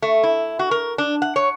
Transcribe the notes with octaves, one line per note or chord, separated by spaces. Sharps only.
A3
E4
F#4
A#4
D4
F#5
C#5